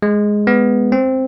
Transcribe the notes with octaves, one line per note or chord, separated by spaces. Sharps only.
G#3
B3
C4